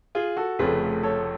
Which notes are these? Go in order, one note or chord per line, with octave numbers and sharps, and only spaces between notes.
F4 G#4
F#4 A4
F1 F2 C#3 F3 A3 G#4 B4
A4 C#5